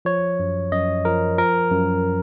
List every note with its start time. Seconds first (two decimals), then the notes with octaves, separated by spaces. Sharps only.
0.05 F3 C#5
0.39 F#2
0.72 F#2 D#5
1.05 F3 A#4
1.38 F3 A#4
1.71 F#2